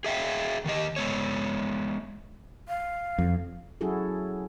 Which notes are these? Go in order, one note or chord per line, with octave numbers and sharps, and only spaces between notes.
G#4 E5 F5 G5
D#3 G4 D#5
G#3 B3 C#5
F5
F2
F#3 C#4 E4 F#4 G#4 A4